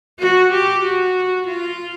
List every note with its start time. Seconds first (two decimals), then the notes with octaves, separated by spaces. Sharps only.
0.19 F#4
0.51 G4
0.83 F#4
1.47 F4